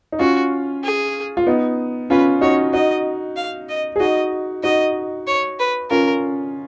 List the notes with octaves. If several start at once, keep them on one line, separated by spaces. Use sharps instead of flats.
D#4
C#4 F4 F#4
G#4
F4
B3 D#4
C#4 F4 B4
D#4 F#4 C#5
D#4 F#4 D#5
F5
D#5
G#4
D#4 F#4 D#5
D#4 F#4 D#5
C#5
B4
C#4 F4 A#4